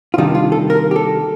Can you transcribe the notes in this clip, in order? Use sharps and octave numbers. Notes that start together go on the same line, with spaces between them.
F4
C3 D#3 G3 D4 D#4
F4
A4
A#4
G4
A4